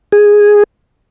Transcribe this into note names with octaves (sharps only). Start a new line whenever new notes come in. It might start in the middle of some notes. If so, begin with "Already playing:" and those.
G#4